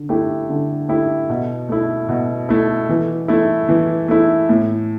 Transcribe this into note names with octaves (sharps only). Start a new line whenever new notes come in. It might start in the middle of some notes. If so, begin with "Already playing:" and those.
Already playing: D3
A3 E4 G4
D3
A3 E4 G4
B2
A3 E4
B2
A3 E4
E3
A3 E4
E3
A3 E4
A2